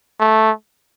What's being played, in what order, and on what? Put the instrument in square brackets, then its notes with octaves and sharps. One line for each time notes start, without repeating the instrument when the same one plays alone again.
[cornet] A3